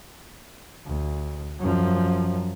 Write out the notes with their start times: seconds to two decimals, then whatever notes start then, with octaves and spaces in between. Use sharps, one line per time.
0.86 D2
1.59 F#2 F3